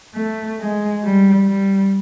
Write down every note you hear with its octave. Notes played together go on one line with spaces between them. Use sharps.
A3
G#3
G3
G3